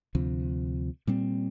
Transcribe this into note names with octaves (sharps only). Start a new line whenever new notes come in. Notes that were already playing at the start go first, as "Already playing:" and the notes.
D2 C3 F3
A#2 G3 C4